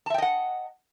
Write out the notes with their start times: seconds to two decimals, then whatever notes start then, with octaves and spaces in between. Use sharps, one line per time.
0.06 A5
0.10 E5
0.14 G5
0.18 D#5
0.22 F#5